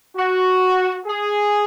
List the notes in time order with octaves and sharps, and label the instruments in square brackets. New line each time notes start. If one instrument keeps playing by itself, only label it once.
[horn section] F#4
G#4